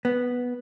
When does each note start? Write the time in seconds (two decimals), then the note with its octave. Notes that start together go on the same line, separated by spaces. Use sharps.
0.05 B3